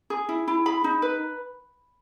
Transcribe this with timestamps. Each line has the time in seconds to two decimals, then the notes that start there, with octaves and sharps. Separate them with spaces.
0.10 G#4
0.29 E4
0.48 E4
0.66 G#4 B5
0.84 D#4
1.02 B4